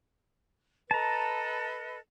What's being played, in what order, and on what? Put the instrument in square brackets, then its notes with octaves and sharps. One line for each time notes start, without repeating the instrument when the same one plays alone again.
[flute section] A4 B4 D#5 [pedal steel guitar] A5 A#5